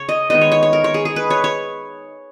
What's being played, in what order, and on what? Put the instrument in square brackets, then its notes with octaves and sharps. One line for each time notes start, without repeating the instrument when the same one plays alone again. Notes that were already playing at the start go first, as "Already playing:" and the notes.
Already playing: [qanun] C#3 C#5
D#5
D#3 G#3 B3 D#5
C#5
C#5
C#5
A#4
C#5
G#4
G#4
B4
C#5
C#5